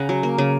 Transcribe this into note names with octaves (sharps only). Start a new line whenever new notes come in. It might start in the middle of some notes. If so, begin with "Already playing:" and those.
Already playing: C#3 F#5 G#5 A#5
F#3
A#3
C#3